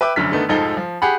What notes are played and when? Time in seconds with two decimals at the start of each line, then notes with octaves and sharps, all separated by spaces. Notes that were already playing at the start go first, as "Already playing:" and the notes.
0.01 B4 E5 G5 D6
0.16 F1 F#2 D3 F6 B6
0.32 D3 D#3 A3 B3 D#4
0.49 F1 G#2 F3 D#4 A4 G7
0.77 F3
1.02 G4 G#4 F#5 B5